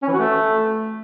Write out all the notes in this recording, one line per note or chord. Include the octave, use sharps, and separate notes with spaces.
C#4
E3
F#4
A3